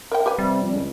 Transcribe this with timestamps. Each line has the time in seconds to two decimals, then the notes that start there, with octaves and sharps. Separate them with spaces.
0.11 A#4 E5 G5
0.26 G4 B4 G#5
0.38 C3 G3
0.62 F2
0.73 C#2